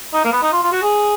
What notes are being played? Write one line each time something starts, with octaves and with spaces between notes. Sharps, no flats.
D#4
A#3
B3
D#4
F4
F4
F#4
G#4